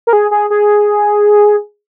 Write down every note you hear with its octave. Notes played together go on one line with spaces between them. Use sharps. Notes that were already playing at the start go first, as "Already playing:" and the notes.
A#4
G#4
G#4
G#4